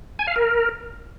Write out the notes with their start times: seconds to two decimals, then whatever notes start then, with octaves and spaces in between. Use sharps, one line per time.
0.19 G#5
0.27 F5
0.36 A#4